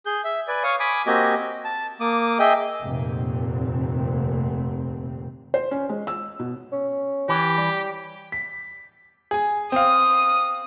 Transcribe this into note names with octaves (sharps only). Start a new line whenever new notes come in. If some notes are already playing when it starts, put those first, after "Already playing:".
G#4 G6
E5
B4 D5 G#5
C#5 F5 C#6 D#6
G#5 B5 D6 D#6
A#3 C4 F#4 G4 D#5 G#5
A5
A#3 D6 D#6
G#4 D#5 E5 G5 D#6
F1 D#2 A#2 C4
C5
C#4
G#3
E6
B2
C#4
E3 G4
G3
B6
G#4 G#5
C4 F5 D#6